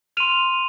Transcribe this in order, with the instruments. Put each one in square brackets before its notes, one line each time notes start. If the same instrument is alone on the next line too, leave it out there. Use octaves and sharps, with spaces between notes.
[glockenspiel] C6 F6 D#7 F7